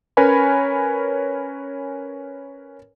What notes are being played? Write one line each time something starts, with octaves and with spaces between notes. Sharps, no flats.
C#4 A#4 B4 C#5 G#5 B5